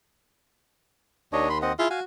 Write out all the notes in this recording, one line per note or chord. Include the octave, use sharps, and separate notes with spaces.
D#2 D4 C#5 D#5
B5 C6
C4 D#5 F#5
E4 F4 G#4 E5
F#4 F5 G#5